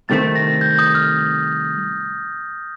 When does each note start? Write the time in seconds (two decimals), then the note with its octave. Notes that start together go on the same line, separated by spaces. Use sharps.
0.09 C2 C3 D#3 A3 C4 A6
0.36 A#6
0.61 G6
0.79 D#6
0.95 F6